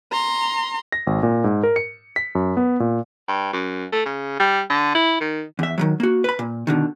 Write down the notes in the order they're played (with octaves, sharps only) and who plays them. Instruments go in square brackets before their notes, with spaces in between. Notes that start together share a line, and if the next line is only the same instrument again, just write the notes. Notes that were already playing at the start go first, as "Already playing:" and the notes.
[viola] A#5 C6
[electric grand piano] A#6
G#1
A#2
G#2
A#4
C#7
B6
F#2
B3
A#2
[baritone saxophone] G2
F#2
A3
C#3
G3
D3
E4
D#3
[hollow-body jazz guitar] E2 E5
D#3 E3 F#3
A#3 F#4
B4 B5
A#2
B2 D3 D#3